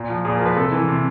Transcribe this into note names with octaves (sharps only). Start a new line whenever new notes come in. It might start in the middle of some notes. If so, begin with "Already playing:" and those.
Already playing: A#2
F3
A#2 G#4
A#4
F3 B4
C3 A4
E3
C3